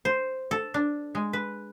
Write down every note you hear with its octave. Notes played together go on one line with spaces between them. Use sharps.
C5
A4
D4
G#3
B4